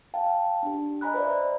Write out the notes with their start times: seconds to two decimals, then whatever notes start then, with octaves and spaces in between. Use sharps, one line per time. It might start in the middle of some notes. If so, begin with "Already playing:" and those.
0.14 F5 G5 A5
0.63 D4 G4
1.01 D#5 G#5 A#5 B5 F#6
1.14 B4 C5 D5 E5